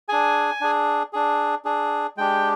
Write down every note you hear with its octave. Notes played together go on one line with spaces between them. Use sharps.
D4 G#4 G#5
D4 G#4
D4 G#4
D4 G#4
G#3 D4 G4 G5